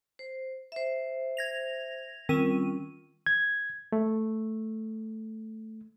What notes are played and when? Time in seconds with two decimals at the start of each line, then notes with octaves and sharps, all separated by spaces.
0.19 C5
0.72 C5 E5
1.37 G#6 A#6 F7
2.29 D#3 G3 C4 C#4 F4 D#7
3.26 G#6
3.92 A3